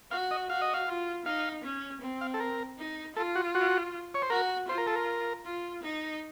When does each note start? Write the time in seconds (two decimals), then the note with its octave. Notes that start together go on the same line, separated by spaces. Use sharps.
0.11 F#4 F5
0.31 D#5
0.49 F#4 F5
0.62 D#5
0.74 F5
0.88 F4
1.26 D#4 F5
1.64 C#4
2.02 C4
2.21 F5
2.34 A4
2.40 A#4
2.78 D#4
3.16 F4 A4
3.35 F#4
3.55 F#4
4.14 C#5
4.22 C5
4.30 F#4 A#4
4.68 F4 C5
4.78 A#4
4.87 A4
4.96 A#4
5.45 F4
5.83 D#4